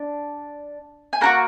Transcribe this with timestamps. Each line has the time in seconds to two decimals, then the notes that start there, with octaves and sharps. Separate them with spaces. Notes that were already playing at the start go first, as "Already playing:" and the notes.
Already playing: D4
1.13 G#5
1.21 A#3 D#4 F#4 F#5 A#5